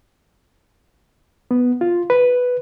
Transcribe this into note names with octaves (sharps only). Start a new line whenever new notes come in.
B3
F4
B4